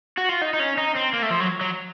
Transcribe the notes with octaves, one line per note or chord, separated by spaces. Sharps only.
F#4
F4
D#4
D#4
C#4
D#4
C4
A#3
A3
F3
F#3
F#3